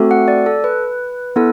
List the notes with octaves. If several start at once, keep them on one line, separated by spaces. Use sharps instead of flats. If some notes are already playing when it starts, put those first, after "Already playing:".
Already playing: A3 C4 F#4 A4
F#5
D5
A4
B4
B3 E4 A4